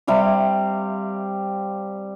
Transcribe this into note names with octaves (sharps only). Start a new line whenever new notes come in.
C3 G3 G4 F5